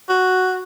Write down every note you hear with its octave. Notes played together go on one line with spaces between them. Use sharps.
F#4